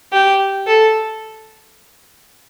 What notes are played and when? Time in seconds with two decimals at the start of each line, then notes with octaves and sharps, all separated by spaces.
0.13 G4
0.67 A4